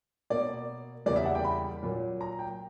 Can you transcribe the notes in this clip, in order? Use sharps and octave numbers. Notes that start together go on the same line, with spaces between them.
B2 A#3 D5
E2 C#3 G3 A#3 D5
E5
F#5
G5
B5
A#2 F#3 A#3
A#5
G5